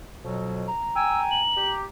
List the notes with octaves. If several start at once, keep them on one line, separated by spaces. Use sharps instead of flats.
F2 B2 F#3
A#5
G5 G#5 E6
F#7
G4